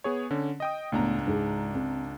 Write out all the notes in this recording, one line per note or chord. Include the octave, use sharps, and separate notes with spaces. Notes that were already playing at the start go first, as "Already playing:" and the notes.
B3 G#4 C#5
D3 C#4
D#5 G5 D#6
C#2 A2 B3 D4 A#5
G#2 G#4
C4